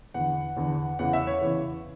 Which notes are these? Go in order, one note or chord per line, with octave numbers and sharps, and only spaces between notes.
E2 D3 F#5
E2 D3
E2 C#3 E3 F#5
E5
C#5
E2 C#3 E3